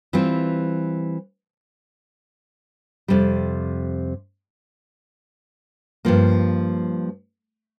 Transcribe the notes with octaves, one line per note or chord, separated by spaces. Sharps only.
E3 G3 C4 F4
F2 C3 G3
G2 F3 A#3